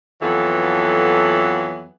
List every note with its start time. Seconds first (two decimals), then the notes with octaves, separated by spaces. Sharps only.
0.22 F2 E3 F#3 B3 A4